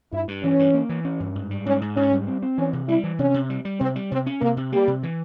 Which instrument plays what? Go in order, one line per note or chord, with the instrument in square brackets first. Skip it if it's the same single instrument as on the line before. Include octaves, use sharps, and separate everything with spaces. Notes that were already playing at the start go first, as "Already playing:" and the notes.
[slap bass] G2 [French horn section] E4
[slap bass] G2
[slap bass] E3 [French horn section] C#4
[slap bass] G2
A#3
E3
C#4
G2
G#2
G3
[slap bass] G#2 [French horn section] C#4
[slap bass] G#2
[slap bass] G#2 [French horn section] C#4
[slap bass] G3
C4
C4
[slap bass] E3 [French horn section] C#4
[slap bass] C3
[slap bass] G3 [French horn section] E4
[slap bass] E3
[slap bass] C3 [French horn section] C#4
[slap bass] C3
G3
G3
[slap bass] C3 [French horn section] C4
[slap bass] G3
[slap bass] C3 [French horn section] C4
[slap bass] C#4
[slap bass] C3 [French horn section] A#3
[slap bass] C3
[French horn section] G3 [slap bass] A#3
[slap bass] C3
E3